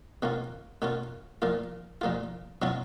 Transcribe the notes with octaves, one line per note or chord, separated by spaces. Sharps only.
B2 A#3 C#4 F4
B2 A#3 C#4 F4
A#2 F3 A#3 F4
A#2 F3 A#3 F4
B2 F#3 C#4 F4